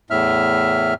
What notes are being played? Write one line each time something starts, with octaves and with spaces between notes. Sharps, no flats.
E2 A2 E5 F6